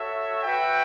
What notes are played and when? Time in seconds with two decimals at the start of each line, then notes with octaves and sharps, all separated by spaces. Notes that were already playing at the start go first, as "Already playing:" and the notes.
Already playing: F#4 A4 C#5 E5
0.44 F#4 B4 E5 G5